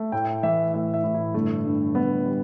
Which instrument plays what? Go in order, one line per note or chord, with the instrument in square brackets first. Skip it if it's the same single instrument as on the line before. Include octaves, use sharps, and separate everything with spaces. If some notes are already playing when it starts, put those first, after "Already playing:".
Already playing: [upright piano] A3
[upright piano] A2 [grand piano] G5
[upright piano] E3 [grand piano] E5
[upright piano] A2 [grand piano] E5
[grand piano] E5
[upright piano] A2
[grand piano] E4
[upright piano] G1 [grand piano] A3
[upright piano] G2
[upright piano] G1 [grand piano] B3
[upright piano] G3